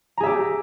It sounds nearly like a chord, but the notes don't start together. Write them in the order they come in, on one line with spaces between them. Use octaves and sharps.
A#5 G#4 E5 G4